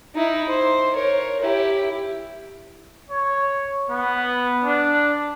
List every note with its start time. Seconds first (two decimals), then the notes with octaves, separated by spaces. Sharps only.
0.15 D#4 E4
0.49 C5
0.93 A#4 C#5
1.41 E4 G4
3.10 C#5
3.90 B3
4.64 D4